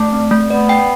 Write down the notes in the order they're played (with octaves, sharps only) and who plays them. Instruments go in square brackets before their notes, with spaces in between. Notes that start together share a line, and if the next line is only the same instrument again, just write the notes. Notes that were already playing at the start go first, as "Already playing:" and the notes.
Already playing: [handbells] A3 [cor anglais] D4
[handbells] C4
A3
[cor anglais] B3 [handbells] D5
[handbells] G5